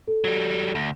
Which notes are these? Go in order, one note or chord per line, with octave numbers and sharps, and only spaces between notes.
A4
F#3 G3
D2